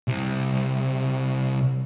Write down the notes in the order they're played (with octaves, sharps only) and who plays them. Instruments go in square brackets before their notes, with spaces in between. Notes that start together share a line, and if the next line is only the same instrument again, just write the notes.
[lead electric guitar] C2 C3